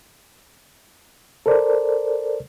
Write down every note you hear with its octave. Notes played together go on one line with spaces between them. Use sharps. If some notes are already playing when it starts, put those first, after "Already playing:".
A4 A#4 C5 D5